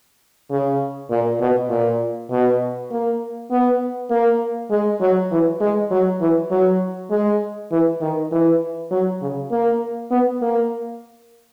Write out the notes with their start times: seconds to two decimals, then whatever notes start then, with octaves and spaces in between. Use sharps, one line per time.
0.51 C#3
1.10 A#2
1.40 B2
1.70 A#2
2.31 B2
2.91 A#3
3.51 B3
4.10 A#3
4.70 G#3
5.01 F#3
5.31 E3
5.60 G#3
5.91 F#3
6.21 E3
6.51 F#3
7.10 G#3
7.71 E3
8.01 D#3
8.31 E3
8.91 F#3
9.22 C#3
9.51 A#3
10.11 B3
10.42 A#3